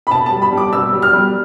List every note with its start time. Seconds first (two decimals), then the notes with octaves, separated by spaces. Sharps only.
0.07 B5
0.10 B2 A5
0.26 G3 A5
0.42 B5
0.52 G3
0.57 D6
0.73 B2 E6
0.93 G3
1.02 F6
1.13 G3